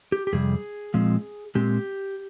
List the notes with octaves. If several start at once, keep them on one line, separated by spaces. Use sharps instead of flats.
G4
G4
F2 C3 G3 G#4
A#2 F3 G#3 C4
A#2 G#3 C4 G4